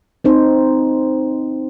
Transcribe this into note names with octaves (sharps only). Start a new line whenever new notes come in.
C4 D#4 C5